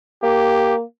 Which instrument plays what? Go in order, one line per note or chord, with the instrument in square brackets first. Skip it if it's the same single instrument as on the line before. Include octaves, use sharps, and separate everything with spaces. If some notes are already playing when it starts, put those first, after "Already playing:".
[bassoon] A#3 [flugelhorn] G4